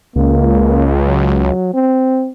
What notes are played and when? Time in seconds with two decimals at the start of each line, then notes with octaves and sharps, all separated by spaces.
0.16 C#2 A#3
1.06 F#3
1.74 C4